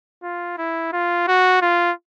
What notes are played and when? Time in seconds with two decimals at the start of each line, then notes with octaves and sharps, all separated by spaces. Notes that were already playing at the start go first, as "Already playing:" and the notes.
0.23 F4
0.58 E4
0.93 F4
1.28 F#4
1.62 F4